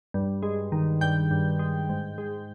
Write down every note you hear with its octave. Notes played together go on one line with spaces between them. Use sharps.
G2
G#3
D#3
G2 G5 G6
G2
G#3
G#2
G#3